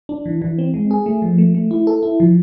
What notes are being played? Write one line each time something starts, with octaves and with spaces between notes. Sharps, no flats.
D4
E3
E3
C4
G#3
G#4
A3
F3
A3
A3
E4
A4
E4
F3